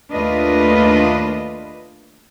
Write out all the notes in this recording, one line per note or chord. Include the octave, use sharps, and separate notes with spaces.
D#2 A3 D4 F4 B4 D#5